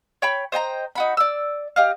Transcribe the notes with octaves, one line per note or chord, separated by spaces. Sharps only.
C#5 G5 B5
C5 D#5 G5 A#5
D#4 F#4 B5
D5 E6
G4 D#5 F5